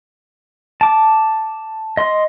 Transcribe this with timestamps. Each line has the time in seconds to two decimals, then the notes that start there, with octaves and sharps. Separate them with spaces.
0.81 A5 D6
1.97 D#5 C6